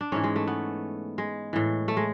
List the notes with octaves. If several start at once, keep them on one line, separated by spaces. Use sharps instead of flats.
D4
G#2 E3 C#4
G#3
A3
B3
G#3
A2 E3
A3
G#3